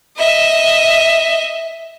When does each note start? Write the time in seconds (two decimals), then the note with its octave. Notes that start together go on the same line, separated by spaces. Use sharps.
0.17 D#5 E5